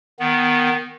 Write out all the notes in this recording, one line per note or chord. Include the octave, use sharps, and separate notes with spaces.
D#3 B3